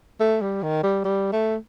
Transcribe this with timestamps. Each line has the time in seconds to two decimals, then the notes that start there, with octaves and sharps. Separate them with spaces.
0.20 A3
0.41 G3
0.63 D#3
0.83 G3
1.05 G3
1.32 A3